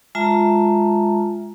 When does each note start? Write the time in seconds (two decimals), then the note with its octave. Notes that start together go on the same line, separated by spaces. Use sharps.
0.15 G#3 F4 E5 A5 A#5